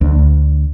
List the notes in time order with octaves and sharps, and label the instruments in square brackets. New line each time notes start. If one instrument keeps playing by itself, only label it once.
[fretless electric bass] D2